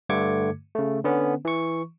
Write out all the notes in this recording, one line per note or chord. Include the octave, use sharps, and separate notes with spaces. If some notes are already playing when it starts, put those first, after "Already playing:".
G2 D3 A3 D6 G#6 C#7
C#3 A3
D3 B3 C#4
E3 C#6